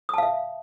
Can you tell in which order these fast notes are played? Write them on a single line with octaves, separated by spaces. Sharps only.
D#6 A5 F5 E5